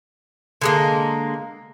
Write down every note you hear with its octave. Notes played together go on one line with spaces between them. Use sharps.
D3 G#3 A#3